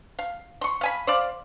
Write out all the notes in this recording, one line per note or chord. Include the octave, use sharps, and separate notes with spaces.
F5
C6 C#6
F5 G#5 B5
C5 D5 F5